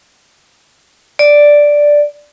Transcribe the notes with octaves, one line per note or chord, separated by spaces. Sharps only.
D5